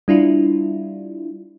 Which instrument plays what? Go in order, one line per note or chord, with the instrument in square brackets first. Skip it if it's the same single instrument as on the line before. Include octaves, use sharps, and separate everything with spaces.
[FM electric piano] G3 D4 E4 F4